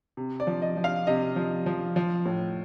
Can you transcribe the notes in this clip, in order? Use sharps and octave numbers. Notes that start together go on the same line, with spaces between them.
C3
D5
F3
D#5
F3
F5
C3 D#5
F3
F3
F3
A2